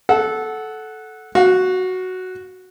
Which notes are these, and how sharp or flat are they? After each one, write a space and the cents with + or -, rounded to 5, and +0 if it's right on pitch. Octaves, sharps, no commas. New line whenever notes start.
A4 -15 F#5 +0
F#4 +0 F5 +40